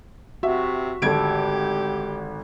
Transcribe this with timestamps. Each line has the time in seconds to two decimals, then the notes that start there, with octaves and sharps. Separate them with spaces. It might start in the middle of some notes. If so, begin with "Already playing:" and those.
0.43 C3 F#4 E5
1.02 G#1 D3 G4 A4 G#6 D7